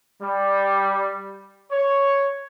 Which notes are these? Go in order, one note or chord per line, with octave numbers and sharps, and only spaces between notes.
G3
C#5